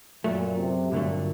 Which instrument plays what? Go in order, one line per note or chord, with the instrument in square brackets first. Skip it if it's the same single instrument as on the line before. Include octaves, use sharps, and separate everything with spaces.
[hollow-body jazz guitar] F#2 F#3 A3 [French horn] A#2
[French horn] C3
[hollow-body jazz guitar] G2 D3 F#3 A3 [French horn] A#2